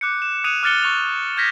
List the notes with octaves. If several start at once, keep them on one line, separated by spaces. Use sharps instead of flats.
D6 F#6 G6 C#7
E7
D#6 F#6 G#6 C#7 D#7 F7
D6 F6 F#6 A6 C#7 G7
C#6 F#6 C#7 F7
F6 G6 G#6 A#6 B6